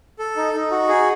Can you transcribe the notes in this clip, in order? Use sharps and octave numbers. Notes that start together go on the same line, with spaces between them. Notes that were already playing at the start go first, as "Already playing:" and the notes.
A4
D#4
D#4
F#4
G#4